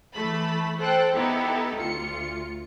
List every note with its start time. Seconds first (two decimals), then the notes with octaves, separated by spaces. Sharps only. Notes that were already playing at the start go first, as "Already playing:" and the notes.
0.13 E3 A3 A5 B5
0.78 A4 C5 G5 F#6
1.14 B3 D#4 E4 G4 A4
1.76 D2 F4 C#7